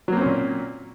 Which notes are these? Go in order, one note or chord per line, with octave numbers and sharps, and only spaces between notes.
A#2 F#3 A#3 C4 C#4